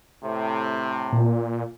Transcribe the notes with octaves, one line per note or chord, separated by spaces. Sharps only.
A2 C3
A#2